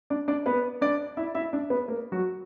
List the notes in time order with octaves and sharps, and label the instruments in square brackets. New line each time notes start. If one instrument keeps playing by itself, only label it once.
[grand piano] D4 D5
D4 D5
B3 B4
D4 D5
E4 E5
E4 E5
D4 D5
B3 B4
A#3 A#4
F#3 F#4